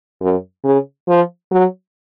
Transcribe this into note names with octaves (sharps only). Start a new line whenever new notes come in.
F#2
C#3
F3
F#3